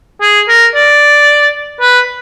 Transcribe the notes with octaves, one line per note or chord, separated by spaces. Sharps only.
G#4
A#4
D5
B4